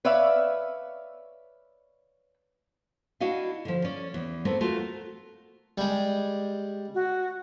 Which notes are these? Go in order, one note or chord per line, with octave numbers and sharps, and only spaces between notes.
B4 C#5 D5 E5 F5
D4 E4 F#4 D#5 F5
D3 F3
C#4 D5
E2
A3 B3 C4 A#4
A3 F4 F#4 A#4
G3 G#3
F#4